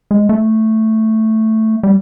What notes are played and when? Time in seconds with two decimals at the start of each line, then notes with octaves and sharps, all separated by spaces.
0.11 G#3
0.29 A3
1.83 G3